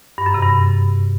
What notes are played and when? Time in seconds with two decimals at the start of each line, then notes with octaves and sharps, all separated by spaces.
0.18 G2
0.26 F#2
0.34 C3
0.42 G2